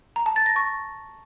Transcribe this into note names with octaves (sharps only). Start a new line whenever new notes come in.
A#5
A5
A6
A#6
C#6